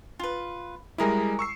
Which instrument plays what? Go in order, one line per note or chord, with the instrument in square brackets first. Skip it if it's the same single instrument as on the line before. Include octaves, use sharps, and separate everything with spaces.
[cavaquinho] F4 B4
[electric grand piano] G3 G#3 E4 [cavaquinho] G#4 A#4 D#6
[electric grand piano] C#6 E6 C7